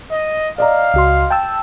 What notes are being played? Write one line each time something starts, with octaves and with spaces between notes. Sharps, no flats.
D#5
D5 D#5 F5 A#5
C#2 F#4 C6
G5 A5 E6